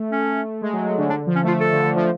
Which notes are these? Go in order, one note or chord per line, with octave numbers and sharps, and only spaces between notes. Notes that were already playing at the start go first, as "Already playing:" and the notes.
Already playing: A3
C#4
G#3
F#3
F#3
D3
D3 D4
F3
C#4
A3 F4
A4
D3
D3
F3